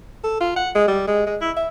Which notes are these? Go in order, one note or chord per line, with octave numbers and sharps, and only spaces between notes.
A4
F4
F#5
G#3
G3
G#3
G#3
E4
E5